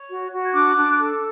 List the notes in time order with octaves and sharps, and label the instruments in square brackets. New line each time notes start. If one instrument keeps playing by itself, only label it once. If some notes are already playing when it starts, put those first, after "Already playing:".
Already playing: [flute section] C#5
F#4
F#4
G#6
D4 D6 F#6
D4
A4